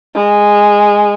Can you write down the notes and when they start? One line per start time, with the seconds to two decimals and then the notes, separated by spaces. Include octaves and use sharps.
0.15 G#3